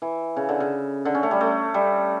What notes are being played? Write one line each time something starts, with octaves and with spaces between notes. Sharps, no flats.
E3
C#3
D3
C#3
D3
C#4
A3
G3
A3
G3